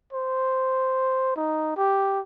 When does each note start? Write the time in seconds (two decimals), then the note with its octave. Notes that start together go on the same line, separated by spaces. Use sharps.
0.13 C5
1.36 D#4
1.77 G4